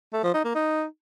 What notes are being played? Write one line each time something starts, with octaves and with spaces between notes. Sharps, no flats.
A3
F3
D#4
A#3
D#4